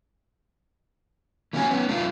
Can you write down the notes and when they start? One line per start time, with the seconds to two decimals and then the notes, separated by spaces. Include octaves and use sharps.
1.53 E3 A#3 C#4 F#4 G#5
1.71 B3 C#4
1.89 A3 D4 F4